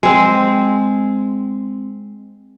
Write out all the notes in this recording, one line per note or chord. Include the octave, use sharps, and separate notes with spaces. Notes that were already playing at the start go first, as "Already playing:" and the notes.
G#3 C4